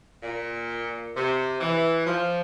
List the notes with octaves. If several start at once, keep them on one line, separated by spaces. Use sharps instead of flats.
A#2
C3
E3
F3